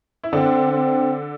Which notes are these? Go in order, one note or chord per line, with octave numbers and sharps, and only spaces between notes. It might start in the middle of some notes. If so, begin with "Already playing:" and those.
E4
D3 C4 D4
C4